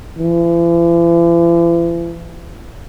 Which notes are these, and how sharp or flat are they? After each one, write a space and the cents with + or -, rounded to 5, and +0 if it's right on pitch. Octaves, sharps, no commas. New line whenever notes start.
E3 +45